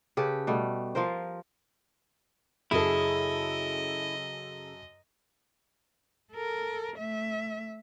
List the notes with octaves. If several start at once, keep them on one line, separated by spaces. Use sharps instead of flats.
C#3 G4 A4 B4
B2 G3 A3
F3 F4 A#4 C5
F#2 C#3 E4 G#4 A4 D#5
A4 A#4
A3 E5